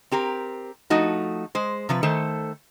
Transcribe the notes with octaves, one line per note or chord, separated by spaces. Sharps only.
C4 G4 A#4
F3 A3 D#4 F#4
G#3 C5
C3 F3 B4
D#3 A3 A4 C5